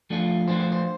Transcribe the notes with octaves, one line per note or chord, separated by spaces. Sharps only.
F3 A3 D4 F4
F3 A3 D4 F4 C5
C5
C5